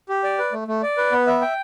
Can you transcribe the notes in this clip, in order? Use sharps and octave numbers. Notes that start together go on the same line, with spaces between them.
G4
D5
B4
A3
A3
D5
B4
B3
E5
G5